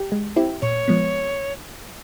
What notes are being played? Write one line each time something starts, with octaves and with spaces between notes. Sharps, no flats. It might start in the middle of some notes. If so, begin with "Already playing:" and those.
Already playing: G4
G#3
C4 E4 G4
A#2 C#5
F3 G#3 B3